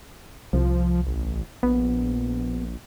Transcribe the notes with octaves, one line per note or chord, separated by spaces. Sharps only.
C2 F3
A1
A#1 B3